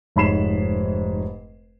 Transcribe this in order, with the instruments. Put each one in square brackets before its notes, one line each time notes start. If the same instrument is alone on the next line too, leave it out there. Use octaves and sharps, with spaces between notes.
[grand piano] F1 G#2 C#5 B5 C7 E7